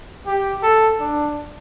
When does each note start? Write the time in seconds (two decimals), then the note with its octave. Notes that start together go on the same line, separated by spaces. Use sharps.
0.27 G4
0.63 A4
1.00 D4